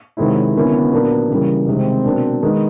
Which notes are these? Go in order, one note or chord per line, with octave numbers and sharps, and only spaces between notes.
C3 D#3 F#3 G#3 C4 E4
D3 F#3 A#3 B3 C#4 E4
A#2 F#3 A#3 D4
C#3 E3 G3 A#3
C3 D#3 G#3 C4
B2 F#3 A#3 D4
D#3 G#3 B3 D#4